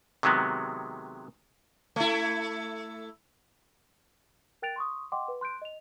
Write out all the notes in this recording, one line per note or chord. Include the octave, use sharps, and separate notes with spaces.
C3 D#3 F#3 G#3 B3
A3 E4
A#4 G5 F#6 A6 D7 F7
C6 C#6 D#6
D#5 F#5 G5 C6 D6
B4
C6 F#6 G6 D7
D#5 F7